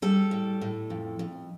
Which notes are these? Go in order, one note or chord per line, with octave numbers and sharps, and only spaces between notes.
G3 A4
A2
A2
F2
F2